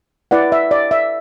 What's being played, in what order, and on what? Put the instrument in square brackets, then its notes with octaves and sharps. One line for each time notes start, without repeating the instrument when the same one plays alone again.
[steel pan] E4 B4 D5 F#5
E5
D5
E5